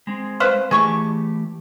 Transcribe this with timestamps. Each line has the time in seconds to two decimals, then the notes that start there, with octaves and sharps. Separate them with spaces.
0.07 G#3 C4
0.40 B4 C5 F5
0.71 E3 A3 G4 G#4 C#6